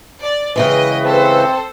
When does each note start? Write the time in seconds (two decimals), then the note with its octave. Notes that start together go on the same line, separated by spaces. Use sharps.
0.21 D5
0.56 C#3 E3 G#3 B4 D#5 G5
1.05 C4 A4 C5